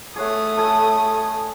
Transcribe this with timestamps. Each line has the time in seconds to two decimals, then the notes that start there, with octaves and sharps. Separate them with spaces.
0.16 A3 G#4 C#5 F#5 D#6
0.57 A4 G#5